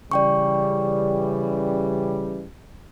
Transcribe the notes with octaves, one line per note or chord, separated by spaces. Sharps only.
C#3 E3 G3 D5 G5 C#6